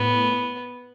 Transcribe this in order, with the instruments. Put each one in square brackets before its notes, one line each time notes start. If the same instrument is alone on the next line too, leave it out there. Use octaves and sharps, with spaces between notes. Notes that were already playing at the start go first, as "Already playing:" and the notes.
Already playing: [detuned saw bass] A2 [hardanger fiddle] B3